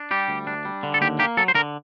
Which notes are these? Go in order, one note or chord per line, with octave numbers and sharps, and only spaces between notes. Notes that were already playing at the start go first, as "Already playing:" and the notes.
Already playing: D4
G3 G4
D2
D4
G3
D3
A4
D#2 G4
A#3 G4
F#3 A4
C5
D3 A#4